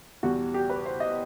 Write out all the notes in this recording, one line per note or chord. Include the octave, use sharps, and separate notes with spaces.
E2 B2 G3 F#4
G4
B4
C5
D#5